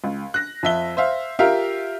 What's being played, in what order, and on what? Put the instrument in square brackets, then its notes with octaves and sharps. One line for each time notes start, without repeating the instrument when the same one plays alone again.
[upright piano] C#2
F#6 A#6
F2 E5 G7
C5 E5 F5
F4 G4 A#4 E5 F5